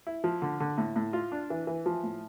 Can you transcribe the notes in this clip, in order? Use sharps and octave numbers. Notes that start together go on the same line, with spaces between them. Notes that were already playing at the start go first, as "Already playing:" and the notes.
E4
F3
D3
D3
A2
A2
F4
D4
E3
E3
F3
A2